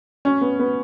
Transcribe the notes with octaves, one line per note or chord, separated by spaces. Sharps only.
C#4
B3
B3